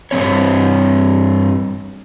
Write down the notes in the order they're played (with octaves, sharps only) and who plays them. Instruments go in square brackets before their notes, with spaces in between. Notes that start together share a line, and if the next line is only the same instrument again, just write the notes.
[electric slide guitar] G2 F3 C4 C#5